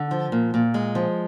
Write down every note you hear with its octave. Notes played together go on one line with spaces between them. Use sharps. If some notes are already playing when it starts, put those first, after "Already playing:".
Already playing: D3
F3
A#2
A#2
G#3
F3